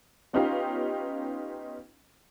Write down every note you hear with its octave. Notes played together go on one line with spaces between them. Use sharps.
B3 C#4 D#4 F4 G4 F5